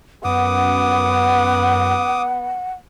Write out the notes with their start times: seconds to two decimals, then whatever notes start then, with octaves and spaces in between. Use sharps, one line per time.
0.24 F#2 B3 F#5 D6 D#6